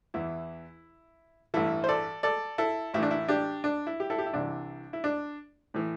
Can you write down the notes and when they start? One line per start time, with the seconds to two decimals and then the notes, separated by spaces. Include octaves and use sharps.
0.14 E2 E3 E4
1.54 A1 G2 E3 E4 A4
1.84 C5
1.89 A4 D5
2.23 A4 D5
2.58 E4 A4
2.94 A1 A2 E3 E4
3.03 D4
3.11 E4
3.28 D4 G4
3.64 D4
3.87 E4
4.00 G4
4.10 E4 A4
4.18 G4
4.26 E4
4.34 C2 C3 E3 D4
4.93 E4
5.04 D4
5.74 A2 E3